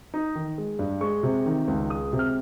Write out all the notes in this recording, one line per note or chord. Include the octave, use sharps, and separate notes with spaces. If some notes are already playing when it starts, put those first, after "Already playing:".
D#4
D#3
G#3
G2
G#3 C#6
C3
D#3
C#2
G#3 D#6
C3
F6